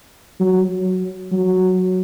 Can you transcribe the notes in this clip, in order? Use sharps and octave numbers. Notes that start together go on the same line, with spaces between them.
F#3
F#3